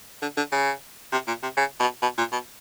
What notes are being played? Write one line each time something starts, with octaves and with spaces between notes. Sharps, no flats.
D3
D3
C#3
C3
A#2
C3
C#3
B2
B2
A#2
B2